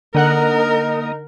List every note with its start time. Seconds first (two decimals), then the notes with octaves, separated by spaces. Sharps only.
0.15 D3 A#3 D#4 A#4 D#5 F#5 A#5 F#6